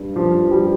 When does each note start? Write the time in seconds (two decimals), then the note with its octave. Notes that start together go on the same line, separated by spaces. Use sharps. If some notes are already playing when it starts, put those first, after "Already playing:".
Already playing: G2
0.16 F3
0.51 G3